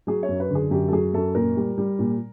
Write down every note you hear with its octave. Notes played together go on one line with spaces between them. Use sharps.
F#3 G#4
C#5
F#2
B4
D3
G#4
F#2 G4
A4
F#3 G#4
F#2 A4
A#2 A#4
G3
G3
A#2